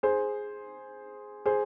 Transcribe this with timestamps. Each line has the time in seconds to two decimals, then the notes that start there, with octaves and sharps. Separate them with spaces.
0.03 G#4 C5
1.46 G#4 C5